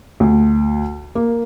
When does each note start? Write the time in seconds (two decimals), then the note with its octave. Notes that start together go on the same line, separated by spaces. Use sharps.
0.20 D2
1.15 A#3